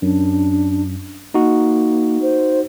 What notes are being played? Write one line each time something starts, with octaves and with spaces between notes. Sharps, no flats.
F#2 D4
A#3 D#4 F#4
C5